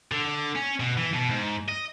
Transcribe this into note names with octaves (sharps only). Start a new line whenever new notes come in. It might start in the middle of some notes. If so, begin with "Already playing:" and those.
D3
C#4
B2
E3
B2
G#2
D#5